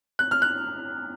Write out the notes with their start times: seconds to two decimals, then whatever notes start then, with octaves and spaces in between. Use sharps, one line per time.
0.19 F#6
0.31 F6
0.42 F#6